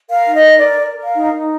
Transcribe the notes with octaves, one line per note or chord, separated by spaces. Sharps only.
A#4 F5
D#4
D#5
A#4
D5
A#4
A#4
A#4
F5
D#4
D#4